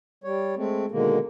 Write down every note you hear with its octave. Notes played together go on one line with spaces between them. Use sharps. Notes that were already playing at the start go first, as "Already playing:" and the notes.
G3 C#5
G#3 A3 C4
B2 D3 D#3 G#3 A#3